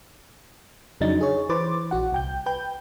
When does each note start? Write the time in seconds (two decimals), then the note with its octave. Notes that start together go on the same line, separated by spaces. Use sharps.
1.01 F2 C#3 F#3 D4 D#4 A6
1.21 G#4 C#5
1.49 E3 B4 C5 D6 A6
1.91 A#1 F#4 F#5
2.12 C2 G5 G6
2.46 B4 G5 G6